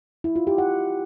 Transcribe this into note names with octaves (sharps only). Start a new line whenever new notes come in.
E4
F4
G4
F#5